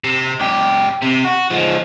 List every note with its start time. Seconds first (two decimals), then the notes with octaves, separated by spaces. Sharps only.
0.04 C3
0.40 C#2 G4
1.02 C3
1.25 F#4
1.50 F3 G#3